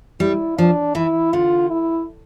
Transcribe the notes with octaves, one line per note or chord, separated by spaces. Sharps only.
G3 E4
F3 D4
E3 E4
D3 F4
E4